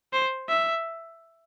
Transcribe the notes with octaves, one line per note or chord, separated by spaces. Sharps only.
C5
E5